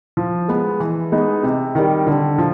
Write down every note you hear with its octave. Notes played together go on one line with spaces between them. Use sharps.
F3
G#3 B3
E3
G#3 B3 D#4
C3
D#3 G3
D3
F3